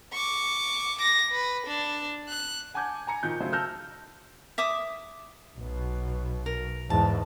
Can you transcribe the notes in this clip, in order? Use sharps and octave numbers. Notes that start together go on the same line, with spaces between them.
C#6 D6
D6 A#6
B4
D4
F#6
F#5 G#5 A5 D6 G6 G#6
G#5 A#5 C#7
A#2 D#3 F3 G6
C#3 F#3 A3 D#4 C5
A5 E6 F6 G6 A#6
E5 D6 D#6
B1 B2
A#4
E2 G#2 A5